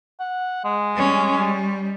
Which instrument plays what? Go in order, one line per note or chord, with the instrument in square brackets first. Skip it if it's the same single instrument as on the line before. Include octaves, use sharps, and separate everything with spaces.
[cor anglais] F#5
G#3
[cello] G3 C#4
G3